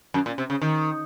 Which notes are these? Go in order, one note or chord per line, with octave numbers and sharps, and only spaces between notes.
F#2
A#2
C3
C#3
D#3